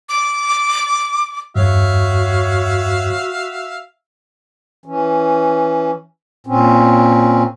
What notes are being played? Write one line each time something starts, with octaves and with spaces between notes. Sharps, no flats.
D6
E2 G2 F#4 C#5 E5 F5
E3 C#4
A#2 C4 C#4